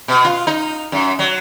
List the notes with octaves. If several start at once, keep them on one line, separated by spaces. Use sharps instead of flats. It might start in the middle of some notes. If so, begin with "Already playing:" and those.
B2
F4
D#4
F#2
F#3